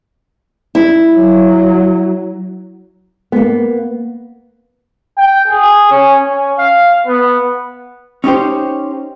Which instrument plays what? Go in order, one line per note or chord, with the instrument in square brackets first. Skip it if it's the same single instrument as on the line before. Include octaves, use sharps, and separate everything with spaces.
[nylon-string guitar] E4
[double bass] F#3
[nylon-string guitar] A#3 B3
[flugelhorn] G5
G#4
C#4
C#4
F5
B3
[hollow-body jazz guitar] C#4 D#4 G4 C5